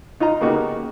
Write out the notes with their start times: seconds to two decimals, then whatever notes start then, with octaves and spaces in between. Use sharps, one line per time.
0.20 D#4 F4 D#5 A#5
0.40 C#3 A#3 B3 D#4 F#4 G4